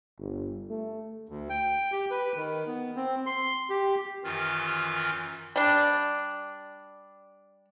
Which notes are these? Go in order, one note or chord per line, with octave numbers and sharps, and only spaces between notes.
G1
A3
D2
G5
G4
B4
D#3
B3
C4
C6
G4
F#2 D#3 E3 F4 F6
G3 D4